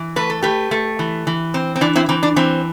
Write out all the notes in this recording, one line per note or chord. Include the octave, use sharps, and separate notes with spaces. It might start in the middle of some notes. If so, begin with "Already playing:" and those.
Already playing: E3
A3 B4
A4
A3 G4 B4
A3
E3
E3
C4
C4
E3 D4
C4 E4
E3 C4
D4
E3 C4